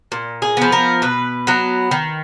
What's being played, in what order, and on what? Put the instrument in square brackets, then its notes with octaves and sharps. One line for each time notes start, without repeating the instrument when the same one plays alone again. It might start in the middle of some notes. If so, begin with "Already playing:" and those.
[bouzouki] A#2
G#4
F3 B3
A#4
B2 B4
F#3 B3
D#3